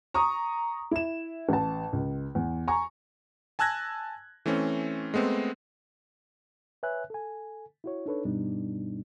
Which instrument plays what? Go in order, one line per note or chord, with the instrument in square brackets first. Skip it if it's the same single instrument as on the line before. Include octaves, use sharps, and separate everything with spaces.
[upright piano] A#5 C#6 D#6
E4 E7
A1 A5
C#2
E2
G#5 A#5 C#6
[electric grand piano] G#5 A5 E6 F#6 G#6 A#6
E3 A3 C4 C#4
G#3 A3 B3 C4
[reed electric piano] B4 C#5 E5 G#5 F#6
A4 G#5
E4 F#4 C#5
D4 D#4 A4 B4 C#5
G2 B2 G3 B3 D4 D#4